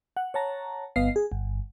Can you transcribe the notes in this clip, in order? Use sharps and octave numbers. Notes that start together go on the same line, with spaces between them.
F#5
C#5 F#5 A5 A#5
G1 B3 B4 D#5 F5 C7
G#4
G1